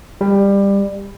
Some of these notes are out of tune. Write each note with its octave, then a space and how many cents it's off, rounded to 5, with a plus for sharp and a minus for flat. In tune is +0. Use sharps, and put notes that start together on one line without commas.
G3 +20